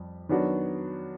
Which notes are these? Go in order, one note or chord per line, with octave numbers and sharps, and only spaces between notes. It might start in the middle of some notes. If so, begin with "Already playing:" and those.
Already playing: F2 G3
D#3 F#3 B3 D4 F#4